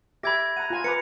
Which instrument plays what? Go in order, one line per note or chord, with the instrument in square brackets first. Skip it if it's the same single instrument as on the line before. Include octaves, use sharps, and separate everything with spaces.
[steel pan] G4 E5 D6 [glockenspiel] B5 G#6 A#6
[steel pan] F#5 A#5 [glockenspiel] D#7
[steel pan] F4 G#5
[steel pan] B4 A#5 D6 [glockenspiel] C#7